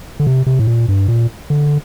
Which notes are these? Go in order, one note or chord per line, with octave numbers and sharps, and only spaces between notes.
D3
C3
C3
A2
A#2
G2
A#2
D3